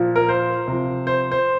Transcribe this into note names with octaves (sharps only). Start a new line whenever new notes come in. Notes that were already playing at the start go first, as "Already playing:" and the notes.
Already playing: A#2 F3
A#4
C5
C3 F3
C5
C5